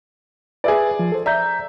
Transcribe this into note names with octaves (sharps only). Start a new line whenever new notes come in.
G#4 B4 D5 E5 G#5
F3
A4 C5
D5 E5 A#5 G6